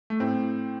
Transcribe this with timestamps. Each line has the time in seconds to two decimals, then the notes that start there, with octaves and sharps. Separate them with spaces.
0.10 A3
0.20 A2 C4